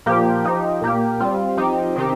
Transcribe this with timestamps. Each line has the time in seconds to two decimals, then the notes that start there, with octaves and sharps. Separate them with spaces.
0.06 A#2 F3 A#3 G4
0.45 F3 D#4 G4
0.81 A#2 A#3 G4
1.20 G3 C4 F4
1.57 F3 C4 D#4 G4
1.96 C3 D#3 C4 D#4 G4